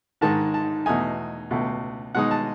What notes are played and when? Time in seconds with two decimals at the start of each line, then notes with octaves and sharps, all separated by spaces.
0.21 G#2 D#3 G#3 A5
0.54 A5
0.86 E2 B2 A3 D#4 G#5
1.51 C#2 B2 A3
2.15 B2 G#3 D#4 F#5
2.31 A5